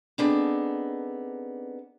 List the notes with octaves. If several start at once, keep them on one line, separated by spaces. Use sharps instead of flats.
B3 C4 D4 D#4 G#4 A4